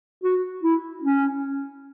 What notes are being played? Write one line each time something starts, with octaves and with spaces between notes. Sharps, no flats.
F#4
E4
C#4